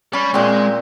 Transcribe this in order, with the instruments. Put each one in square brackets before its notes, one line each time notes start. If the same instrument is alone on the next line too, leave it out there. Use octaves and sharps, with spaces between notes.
[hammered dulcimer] C#4 [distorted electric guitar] D5 B5
[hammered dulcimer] A#2 C4 [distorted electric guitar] G#3